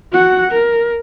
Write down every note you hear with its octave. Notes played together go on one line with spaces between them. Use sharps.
F#4 F#5
A#4